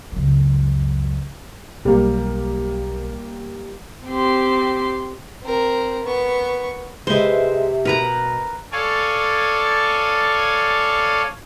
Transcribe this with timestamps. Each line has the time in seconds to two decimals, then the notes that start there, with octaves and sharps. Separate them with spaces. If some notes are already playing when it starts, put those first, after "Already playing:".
0.12 C#2 F#2
1.85 B1 G3 A#3
4.07 C4 G4 C6
5.43 C4 A#4
6.04 B3 C#6
7.07 C3 G#3 B4 C5 D#5 E5
7.85 B2 A#4 B4 A#5
8.72 A4 C#5 D5 F5 G#5